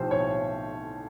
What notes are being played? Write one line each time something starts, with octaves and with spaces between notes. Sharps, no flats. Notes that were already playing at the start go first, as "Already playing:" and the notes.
Already playing: B1 A2 F3 G4 C5
C#5